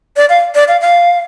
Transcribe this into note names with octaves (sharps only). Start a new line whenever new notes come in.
D5
F5
D5
F5
F5